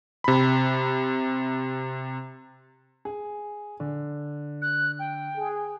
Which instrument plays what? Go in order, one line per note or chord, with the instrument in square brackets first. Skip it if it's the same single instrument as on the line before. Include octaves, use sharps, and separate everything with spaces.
[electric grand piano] C3 B5
[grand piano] G#4
D3
[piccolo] F#6
G5
[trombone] G#4